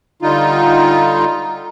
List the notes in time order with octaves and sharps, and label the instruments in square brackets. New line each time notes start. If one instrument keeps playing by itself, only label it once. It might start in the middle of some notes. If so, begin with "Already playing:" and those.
[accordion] D3 G3 D#4 F4